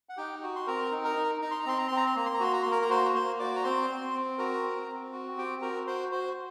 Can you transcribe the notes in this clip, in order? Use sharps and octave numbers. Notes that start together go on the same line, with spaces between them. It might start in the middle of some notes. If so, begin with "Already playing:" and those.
F#5
D#4 G4 G5
F#4
C6
C4 A#4 A#5
D#4
A#4 A#5
D#4
D#4 A#5
C6
A#5
C4 C6
A#5
C4 C6
A#5
C6
A#3 A#5
C6
A#5
F#4 C6
A#5
A#3 C6
A#4 A#5
A#5
F#4 C5 C6
A#5
A#3 C5 C6
F#4 D5 D6
A#5
C4 C5 C6
C4
C4
F#4 A#4 A#5
C4
C4
F#4
C4 G4 G5
F#4 A#4 A#5
F#4 C5 C6
F#4 C5 C6